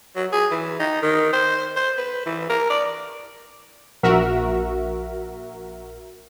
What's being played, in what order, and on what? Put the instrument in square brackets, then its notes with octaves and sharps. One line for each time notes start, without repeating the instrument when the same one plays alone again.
[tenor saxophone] F#3
G#4
E3
D#4
D#3
C5
C5
B4
E3
A#4
D5
[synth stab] A#1 F#4 A#4 E5